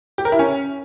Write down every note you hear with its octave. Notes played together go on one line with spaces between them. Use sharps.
G4
A#4
E4
C#4